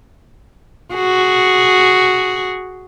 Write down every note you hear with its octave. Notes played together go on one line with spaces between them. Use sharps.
F#4 G#4